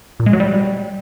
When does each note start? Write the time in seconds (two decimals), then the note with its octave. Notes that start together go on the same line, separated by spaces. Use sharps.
0.20 A#2
0.26 G#3
0.33 F#3
0.40 G3